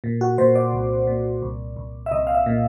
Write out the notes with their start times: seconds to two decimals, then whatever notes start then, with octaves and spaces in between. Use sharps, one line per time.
0.04 A#2
0.21 F#4
0.38 A#2 C5
0.55 D5
0.73 C2
1.07 A#2
1.42 C2
1.76 C2
2.06 E5
2.11 C2 D#5
2.27 F5
2.34 E5
2.46 A#2